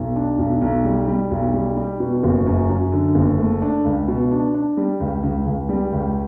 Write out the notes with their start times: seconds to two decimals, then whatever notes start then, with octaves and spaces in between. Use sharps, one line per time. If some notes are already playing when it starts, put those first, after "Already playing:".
Already playing: B1
0.16 D4
0.39 B1
0.62 B1
0.85 G3
1.08 G3
1.31 B1
1.54 G3
1.77 G3
2.00 B2
2.23 F#1
2.46 F#2
2.69 F#2
2.92 D3
3.15 F#1
3.38 A3
3.62 D4
3.85 C#2
4.08 B2
4.31 D4
4.54 D4
4.77 G3
5.00 C#2
5.23 C#2
5.46 C#2
5.69 G3
5.92 C#2